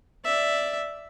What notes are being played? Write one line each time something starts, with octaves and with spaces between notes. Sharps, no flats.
D5 E5